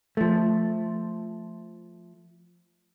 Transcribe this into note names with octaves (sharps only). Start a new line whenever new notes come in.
F3 A3